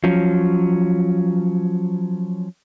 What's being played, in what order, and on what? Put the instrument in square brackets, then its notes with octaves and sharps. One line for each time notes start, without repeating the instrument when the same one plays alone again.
[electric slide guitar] F3 F#3 C#4